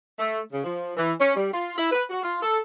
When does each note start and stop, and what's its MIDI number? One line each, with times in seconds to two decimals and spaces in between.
0.19 0.39 57
0.52 0.63 49
0.64 0.92 53
0.97 1.12 52
1.20 1.33 61
1.36 1.52 55
1.53 1.73 65
1.78 1.91 64
1.92 2.03 71
2.09 2.21 66
2.23 2.38 65
2.42 2.58 69